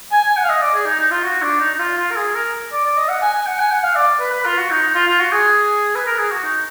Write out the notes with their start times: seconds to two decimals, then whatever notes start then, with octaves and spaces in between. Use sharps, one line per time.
0.12 G#5
0.24 G#5
0.37 F#5
0.44 F5
0.49 D#5
0.62 D5
0.74 G#4
0.86 D#4
0.99 D#4
1.11 F4
1.23 F#4
1.42 D4
1.60 D#4
1.74 D#4
1.79 F4
1.97 F4
2.11 A#4
2.16 G#4
2.35 A#4
2.72 D5
2.85 D5
2.97 D#5
3.09 F#5
3.22 G#5
3.34 G#5
3.46 F#5
3.59 G#5
3.71 F#5
3.83 F5
3.96 D5
4.20 B4
4.32 B4
4.45 F4
4.57 F#4
4.70 D#4
4.82 D#4
4.95 F4
5.07 F4
5.20 F#4
5.32 G#4
5.95 B4
6.06 A#4
6.18 G#4
6.31 F#4
6.44 D#4